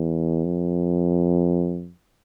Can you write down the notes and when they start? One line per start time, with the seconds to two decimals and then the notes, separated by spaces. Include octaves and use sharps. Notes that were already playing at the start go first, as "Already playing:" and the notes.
Already playing: E2
0.45 F2